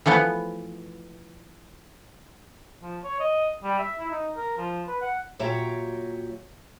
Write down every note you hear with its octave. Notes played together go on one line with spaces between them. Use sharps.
E3 F3 A3 B3
F3
C#5
D#5
G3
E5
E4
D#4
A#4
F3
B4
F#5
A#2 F#3 G4 C#5 E5 A#5